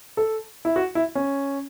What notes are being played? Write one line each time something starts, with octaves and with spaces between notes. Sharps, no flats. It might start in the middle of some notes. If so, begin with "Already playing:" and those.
A4
E4
F#4
E4
C#4